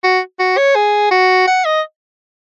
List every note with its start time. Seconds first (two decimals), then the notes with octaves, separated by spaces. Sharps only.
0.04 F#4
0.39 F#4
0.57 C#5
0.75 G#4
1.11 F#4
1.47 F#5
1.65 D#5